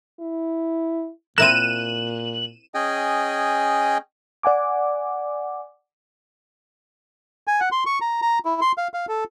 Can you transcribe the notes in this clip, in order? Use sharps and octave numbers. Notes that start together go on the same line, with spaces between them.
E4
A#2 C4 E4 A#4 F#6 D#7 E7
C#4 G#4 D#5 G5 G#5
D5 F#5 G#5 D6
G#5
F#5
C6
C#6
A#5
A#5
E4
C6
F5
F5
A4